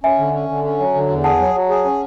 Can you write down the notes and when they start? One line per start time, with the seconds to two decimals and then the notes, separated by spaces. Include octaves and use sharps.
0.03 C#4 E5 G#5
0.19 D3
0.34 C#4
0.49 D3
0.64 C#4
0.79 F#3
0.94 D3
1.09 E2
1.24 G#4 F#5 A5
1.39 F#3
1.55 F#3
1.69 G#4
1.85 C#4